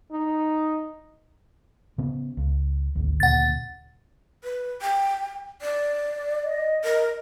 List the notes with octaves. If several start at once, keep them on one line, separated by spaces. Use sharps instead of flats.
D#4
C#3 B3 C#4
C#2
G#1 D2
D2 A#2 C#3 F#5 A6
B4
G5
D5
D#5
A#4